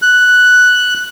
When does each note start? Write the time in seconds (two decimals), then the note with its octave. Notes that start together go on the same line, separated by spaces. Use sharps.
0.02 F#6